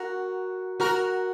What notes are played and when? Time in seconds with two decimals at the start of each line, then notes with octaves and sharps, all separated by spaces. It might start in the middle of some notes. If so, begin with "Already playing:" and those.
Already playing: F#4 A#4
0.80 F#4 A#4